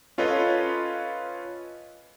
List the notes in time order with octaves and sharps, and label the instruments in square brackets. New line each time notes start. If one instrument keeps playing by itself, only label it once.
[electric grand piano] C#4 F4 A4 B4 C#5 D#5